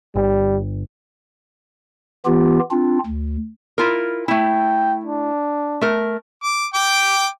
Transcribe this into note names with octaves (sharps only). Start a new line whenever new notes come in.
G1 G3
E3 B3 F4 G4
C4 D4 F4
D2
E4 F4 A#4
A3 E4 G5
D4
A3 A#4
D6
G5 D6